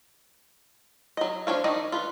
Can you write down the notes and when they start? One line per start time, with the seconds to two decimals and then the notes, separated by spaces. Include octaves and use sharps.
1.17 F#3 D#5
1.47 F3 D4 C#5 F5
1.64 D#3 D5 D#5
1.92 F4 B4